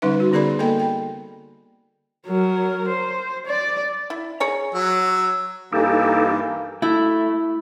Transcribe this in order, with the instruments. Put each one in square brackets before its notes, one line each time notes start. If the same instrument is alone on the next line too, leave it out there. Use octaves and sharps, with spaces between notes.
[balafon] D3 G3 C#4 D#4 B4 E5
F#4
D3 B3 G#4 A#4 D5 B5
A#3 A4 D#5 G5 B5
G5
[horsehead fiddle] F#3 A#4
C5
D5
[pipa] E4
G#4 C#5 A#5
[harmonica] F#3 [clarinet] E6
[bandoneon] G2 E3 A#3 [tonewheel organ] D#4 G4 A4
[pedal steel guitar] A3 [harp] E4